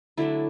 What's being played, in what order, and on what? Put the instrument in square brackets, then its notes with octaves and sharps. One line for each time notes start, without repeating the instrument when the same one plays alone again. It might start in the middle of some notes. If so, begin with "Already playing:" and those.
[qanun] D3 F#3 A3 D4 E4